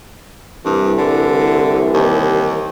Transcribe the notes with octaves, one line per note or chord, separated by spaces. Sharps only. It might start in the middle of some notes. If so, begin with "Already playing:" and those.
C2 G2 E3
D3
D#2